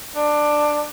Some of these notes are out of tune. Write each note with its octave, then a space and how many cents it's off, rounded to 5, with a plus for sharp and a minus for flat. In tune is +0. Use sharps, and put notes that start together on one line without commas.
D4 +15